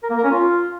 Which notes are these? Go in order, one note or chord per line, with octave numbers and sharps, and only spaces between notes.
A#4
A#3
A#4
C#4
F4